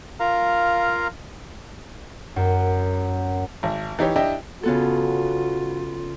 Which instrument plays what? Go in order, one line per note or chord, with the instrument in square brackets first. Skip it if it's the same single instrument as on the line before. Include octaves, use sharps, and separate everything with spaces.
[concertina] F4 A#4 F5 A#5
[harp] F#2
[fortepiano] G#1
E3 D#4 G4 C#5
D4 E4 G4 D#5 E5 G5
[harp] C#3 B3 A4 [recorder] F4 [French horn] F#4